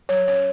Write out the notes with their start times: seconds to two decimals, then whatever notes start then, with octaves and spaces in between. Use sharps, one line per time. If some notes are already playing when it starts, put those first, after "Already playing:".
0.09 F#3 C#5
0.28 C#4 C#5